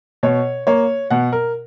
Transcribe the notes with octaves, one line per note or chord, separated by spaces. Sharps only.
B2 C#5
A#3 C#5
B2 F#5
A#4